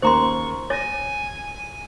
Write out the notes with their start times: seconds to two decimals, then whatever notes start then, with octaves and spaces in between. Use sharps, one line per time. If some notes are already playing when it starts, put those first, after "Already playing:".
0.02 D#2 C#3 A#3 C5 A#5 C6 C#6
0.70 C#5 G#5 A6 A#6